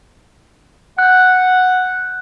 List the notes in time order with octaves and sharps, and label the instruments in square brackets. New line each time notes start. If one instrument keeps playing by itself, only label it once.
[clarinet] F#5 [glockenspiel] F#6 G6